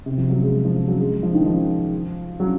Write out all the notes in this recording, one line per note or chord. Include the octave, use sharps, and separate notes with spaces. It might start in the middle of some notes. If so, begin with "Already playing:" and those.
C3
F3
F#3
G#3
F3
F#3
G#3
F3
D#3
F3
F#3